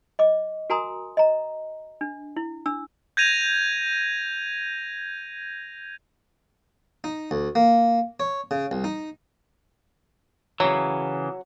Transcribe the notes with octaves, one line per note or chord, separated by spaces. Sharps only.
D#5 D6
F#4 A#4 G#5 A#5 C6 D#6
D#5 A#5
D4
E4
D4 E6
G6 G#6 A#6 D#7 F7
D#4
D2
A#3
C#5
C#3
C2
D#4
C#3 E3 F#3